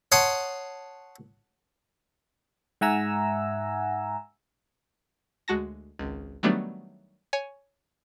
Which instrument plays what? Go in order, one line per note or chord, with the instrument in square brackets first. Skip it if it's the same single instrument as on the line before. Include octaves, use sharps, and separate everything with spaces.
[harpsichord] C#5 F#5 A5 C6 D#6
[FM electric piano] G#2 E5 F#5 G#5 A#5 E6
[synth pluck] D2 G#3 F#4 A5 A#6
G#1 C#2
D#3 F#3 G3 A3 B3 D4
C#5 G#5 C#6